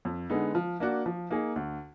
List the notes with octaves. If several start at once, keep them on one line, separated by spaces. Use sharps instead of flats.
F2
D3 G#3 B3 D#4
F3
A#3 D4 F#4
F3
A#3 D#4 G#4
D2